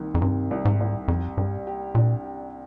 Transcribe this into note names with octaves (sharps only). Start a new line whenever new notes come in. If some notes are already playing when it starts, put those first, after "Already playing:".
Already playing: C2 D#3 A#3
F2
G2 C3
C2
G#2
C2
F2 G4
G2 G3
G4
A#2 D4
G4